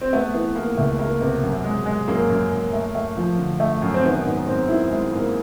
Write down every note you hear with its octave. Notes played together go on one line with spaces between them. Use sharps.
C4
A3 B3
E3 B3
E3 A#3
C#2 A3
A3 A#3
C3 B3
F#2
G#3
G#3
F#2 A#3
F#2
F#2
A3
A3
F3
D3
A3
F#2
C4
D#3 B3
G#2 B3
G#2 C4
D#3 E4
G#3 E4
G#2 A#3